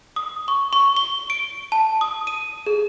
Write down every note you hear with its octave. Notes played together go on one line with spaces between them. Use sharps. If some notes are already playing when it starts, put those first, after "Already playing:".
D#6
C#6
C#6
G7
D7
A5
D#6
D#7
G#4